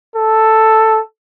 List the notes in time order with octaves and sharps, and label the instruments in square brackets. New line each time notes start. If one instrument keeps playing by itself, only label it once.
[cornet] A4